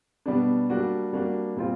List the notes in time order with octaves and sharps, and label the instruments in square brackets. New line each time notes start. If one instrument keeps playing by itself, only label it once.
[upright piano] B2 G3 B3 D4
G3 A#3 D4 F#4
G3 A#3 D4 F#4
A#2 G3 C4 F4